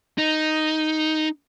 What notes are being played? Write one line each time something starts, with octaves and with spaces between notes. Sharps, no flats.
D#4